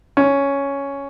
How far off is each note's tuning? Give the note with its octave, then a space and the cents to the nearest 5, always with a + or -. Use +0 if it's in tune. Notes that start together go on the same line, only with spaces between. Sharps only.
C#4 +5